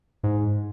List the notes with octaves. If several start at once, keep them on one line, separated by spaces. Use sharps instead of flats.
G#2